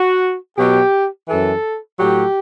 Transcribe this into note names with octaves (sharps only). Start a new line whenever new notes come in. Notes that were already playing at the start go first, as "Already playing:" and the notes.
Already playing: F#4
B2 F#3 G4
F#2 E3 A4
A2 F#3 G4